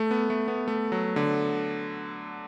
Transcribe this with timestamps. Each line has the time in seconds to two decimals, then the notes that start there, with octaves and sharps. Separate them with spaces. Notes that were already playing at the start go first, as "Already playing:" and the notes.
Already playing: A3
0.11 B3
0.30 A3
0.48 B3
0.68 A3
0.92 F#3
1.16 D3